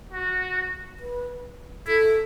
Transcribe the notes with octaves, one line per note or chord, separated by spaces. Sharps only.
F#4
B4
E4 A4